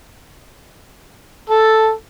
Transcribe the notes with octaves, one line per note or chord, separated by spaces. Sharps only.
A4